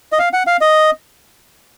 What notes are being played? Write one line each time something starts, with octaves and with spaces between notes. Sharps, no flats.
D#5
F5
F#5
F5
D#5